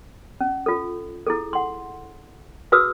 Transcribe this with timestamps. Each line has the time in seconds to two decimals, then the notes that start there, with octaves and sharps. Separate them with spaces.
0.40 C#4
0.66 F4 A4
1.27 E4 G#4 A4
1.53 F#5 C6
2.72 F#4 G#4 B4 D#6 E6